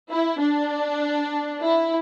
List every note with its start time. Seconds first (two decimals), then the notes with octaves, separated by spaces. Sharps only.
0.10 E4
0.40 D4
1.61 E4